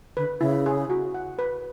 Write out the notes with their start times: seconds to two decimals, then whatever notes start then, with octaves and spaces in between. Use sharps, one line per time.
0.17 D3 B4
0.41 C#3 E4
0.66 G#4
0.90 F#4
1.14 F#5
1.39 B4